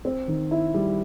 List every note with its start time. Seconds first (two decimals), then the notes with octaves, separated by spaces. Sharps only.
0.05 C4
0.28 D#3
0.51 E4
0.74 G3